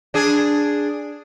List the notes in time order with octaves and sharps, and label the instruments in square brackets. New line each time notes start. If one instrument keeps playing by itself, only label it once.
[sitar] D4 G#4